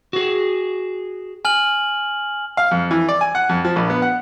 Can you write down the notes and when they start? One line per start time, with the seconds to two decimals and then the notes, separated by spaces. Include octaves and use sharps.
0.13 F#4 G#4
1.45 G#5 F6 F#7
2.57 F5
2.71 F2
2.91 E3
3.09 D5
3.21 G#5
3.35 F#5
3.49 F2
3.64 F3
3.76 A#1
3.90 B3
4.02 F#5